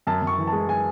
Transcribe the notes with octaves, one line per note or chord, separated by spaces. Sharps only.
F#2 A5
F#2
C#6
E3
A5
G#3
G#3 G#5